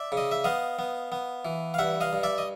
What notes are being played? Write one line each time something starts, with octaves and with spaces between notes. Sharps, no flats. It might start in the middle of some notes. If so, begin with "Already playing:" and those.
Already playing: D5 E5
C#3
D#5
E5
B3 D#5 F5
B3
B3
E3
F5
G2 E5 F#5
D#5 F5
G2
D5 E5
D#5